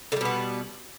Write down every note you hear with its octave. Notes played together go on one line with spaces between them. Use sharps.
B2 D3 G3 B3